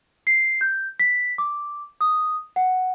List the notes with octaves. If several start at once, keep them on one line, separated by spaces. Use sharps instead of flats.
C7
G6
B6
D6
D#6
F#5